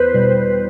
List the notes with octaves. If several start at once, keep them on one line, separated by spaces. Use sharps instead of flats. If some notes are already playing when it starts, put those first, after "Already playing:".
Already playing: E2 B4 C5
B2 G3